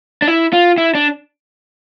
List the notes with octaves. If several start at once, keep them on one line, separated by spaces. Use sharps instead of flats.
D4
E4
F4
E4
D4